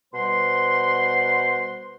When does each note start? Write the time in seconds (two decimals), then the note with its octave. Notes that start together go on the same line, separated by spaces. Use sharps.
0.14 B2 G3 C5 F#5 C6